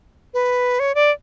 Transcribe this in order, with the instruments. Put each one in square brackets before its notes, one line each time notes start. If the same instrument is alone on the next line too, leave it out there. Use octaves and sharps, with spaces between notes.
[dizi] B4
C#5
D5